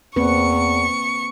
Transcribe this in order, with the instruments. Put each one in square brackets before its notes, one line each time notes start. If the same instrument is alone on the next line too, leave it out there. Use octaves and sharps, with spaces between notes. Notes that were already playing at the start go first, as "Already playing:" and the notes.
[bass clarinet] E2 [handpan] A#3 C4 B4 [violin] C#6 C#7